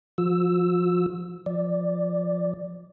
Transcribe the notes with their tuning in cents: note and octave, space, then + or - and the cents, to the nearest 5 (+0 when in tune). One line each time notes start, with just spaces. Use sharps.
F3 +0 F4 +45 E6 +0
F3 +0 D5 +0